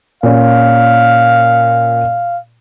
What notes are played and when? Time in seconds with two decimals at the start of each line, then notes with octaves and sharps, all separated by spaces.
0.23 A#2 C#4 F5